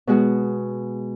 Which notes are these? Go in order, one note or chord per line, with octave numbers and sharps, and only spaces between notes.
B2 G#3 F#4